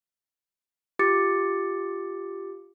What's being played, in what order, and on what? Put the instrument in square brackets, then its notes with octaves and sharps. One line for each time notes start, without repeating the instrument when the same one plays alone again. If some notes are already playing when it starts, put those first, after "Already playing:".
[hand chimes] F4 G4 D6 A6 C#7